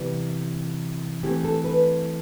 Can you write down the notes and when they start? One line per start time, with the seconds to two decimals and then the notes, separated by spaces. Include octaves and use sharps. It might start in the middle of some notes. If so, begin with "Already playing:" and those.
Already playing: C3 E3 G3 B3
1.23 E3 A3 C4 G4
1.44 A4
1.64 B4